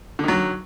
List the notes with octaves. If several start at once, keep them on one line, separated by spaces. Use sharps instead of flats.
D3 D#3 F#3